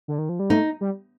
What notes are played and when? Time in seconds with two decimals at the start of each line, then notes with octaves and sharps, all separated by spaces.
0.08 D3
0.18 D#3
0.29 F3
0.39 G3
0.50 A3 D#4
0.81 G3